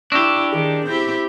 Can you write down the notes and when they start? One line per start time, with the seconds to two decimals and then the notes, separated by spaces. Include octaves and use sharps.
0.12 D4 E4 G4 C#6 E6 A#6
0.52 D#3 G#4
0.87 C4 E4 G4 G6